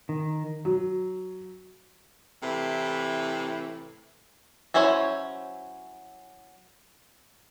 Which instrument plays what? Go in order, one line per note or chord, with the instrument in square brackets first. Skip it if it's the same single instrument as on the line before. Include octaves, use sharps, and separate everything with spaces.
[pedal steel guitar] D#3
[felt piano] F#3
[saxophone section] A2 C3 E3
[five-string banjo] F#3 C#4 E4 C5 C#5